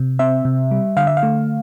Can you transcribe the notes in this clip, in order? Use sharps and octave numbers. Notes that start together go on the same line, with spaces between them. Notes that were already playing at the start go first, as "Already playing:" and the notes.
Already playing: C3
C4 E5
C3
G3
D3 F5
E5
F5
A3